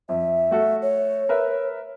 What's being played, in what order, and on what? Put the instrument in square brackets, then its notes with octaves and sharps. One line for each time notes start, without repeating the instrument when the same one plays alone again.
[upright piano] F2 [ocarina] E5
[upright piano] A3 F#4 A4
[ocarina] C#5
[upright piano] A#4 B4 E5